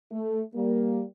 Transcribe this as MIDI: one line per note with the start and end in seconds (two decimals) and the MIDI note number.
0.12 0.41 57
0.55 1.04 55
0.55 1.04 58